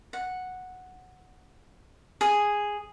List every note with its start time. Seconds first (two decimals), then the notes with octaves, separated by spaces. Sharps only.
0.13 F#5
2.21 G#4